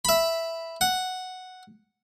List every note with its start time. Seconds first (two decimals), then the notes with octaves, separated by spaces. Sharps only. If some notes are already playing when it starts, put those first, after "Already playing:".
0.05 E5 B5
0.81 F#5